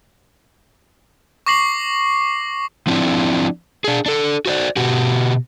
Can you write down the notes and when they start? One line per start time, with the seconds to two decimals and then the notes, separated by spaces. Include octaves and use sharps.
1.46 C#6 D6 A#6 C7 F#7
2.87 F3 C4 D4 E4
3.84 D4 G#4
4.06 D4 A4
4.46 F#4 C5 D5
4.77 B2 F#4 G4